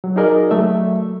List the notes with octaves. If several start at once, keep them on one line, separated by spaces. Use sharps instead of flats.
F#3
D#4 F#4 G#4 A#4 D5 D#5
F#3 A3 E5